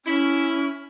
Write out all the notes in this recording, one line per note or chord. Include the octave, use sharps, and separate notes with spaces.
C#4 E4